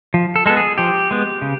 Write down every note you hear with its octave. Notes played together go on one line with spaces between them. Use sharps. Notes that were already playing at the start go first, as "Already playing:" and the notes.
F3
A4
G#3 B3 A4
G#4
F3 G4
G#3 B3
C#3